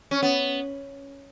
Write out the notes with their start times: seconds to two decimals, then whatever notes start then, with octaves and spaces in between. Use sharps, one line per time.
0.11 C#4
0.23 B3